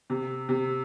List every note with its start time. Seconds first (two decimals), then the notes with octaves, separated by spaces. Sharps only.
0.10 C3
0.49 C3